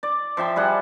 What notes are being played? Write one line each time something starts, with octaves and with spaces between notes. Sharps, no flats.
D5
F3 E5 G5 C6
G3 G#4 F#5 A5